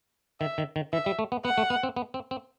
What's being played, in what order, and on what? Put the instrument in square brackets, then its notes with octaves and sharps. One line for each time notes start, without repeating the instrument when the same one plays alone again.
[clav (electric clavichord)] D#3 [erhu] E5
[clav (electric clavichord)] D#3
D#3
[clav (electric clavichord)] E3 [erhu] E5
[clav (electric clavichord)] G3
A3
B3
[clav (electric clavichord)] B3 [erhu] F#5
[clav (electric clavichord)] A3
B3
C4
B3
C4
C4